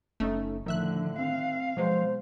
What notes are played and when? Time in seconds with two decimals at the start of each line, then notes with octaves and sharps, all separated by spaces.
0.20 F#1 A3 C#4 D#4
0.66 A2 D3 D#3 F3 E5 F#6
1.19 C4 F5
1.77 B2 F3 F#3 G#3 C5